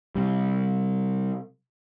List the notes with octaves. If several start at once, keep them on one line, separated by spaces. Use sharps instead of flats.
C3 G3